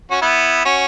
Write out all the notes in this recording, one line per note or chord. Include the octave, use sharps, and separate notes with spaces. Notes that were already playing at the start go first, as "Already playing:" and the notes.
C#4 F#4
B3 E4
C#4 F#4